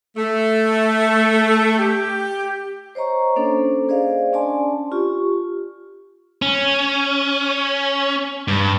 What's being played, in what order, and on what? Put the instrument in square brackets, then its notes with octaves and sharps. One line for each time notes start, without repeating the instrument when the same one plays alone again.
[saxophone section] A3
G4
[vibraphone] C5 C#5 D#5 A#5 C#6
A#3 C#4 D4 A4 C5
G#4 C5 D5 D#5 F5
C#4 D4 D5 G#5 A5 C6
F4 G4 C#6
[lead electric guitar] C#4
G2